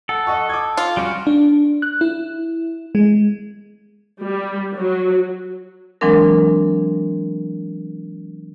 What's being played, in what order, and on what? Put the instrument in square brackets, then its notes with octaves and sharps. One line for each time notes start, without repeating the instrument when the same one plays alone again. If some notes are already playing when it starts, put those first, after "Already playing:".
[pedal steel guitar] A4 [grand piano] F#5
[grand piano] D#5 F#5 C#6
D6 D#6 G#6
[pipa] F4
[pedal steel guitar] G3 C#4 F#4 [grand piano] D7
[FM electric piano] D4
F#6
E4
G#3
[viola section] G3
F#3
[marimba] E3 F#3 G#3 C4 D4 A#4